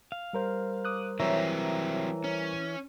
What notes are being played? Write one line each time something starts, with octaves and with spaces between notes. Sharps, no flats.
F5
G3 A#4 C5
D6 D#6 F#6
E3 F#3 C4 G4 C#5 E5 A#5
C#4